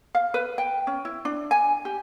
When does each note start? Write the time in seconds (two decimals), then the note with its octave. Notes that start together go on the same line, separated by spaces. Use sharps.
0.15 F5
0.34 B4
0.58 G5
0.87 C#4
1.05 E4
1.25 D4
1.51 G#5
1.85 G4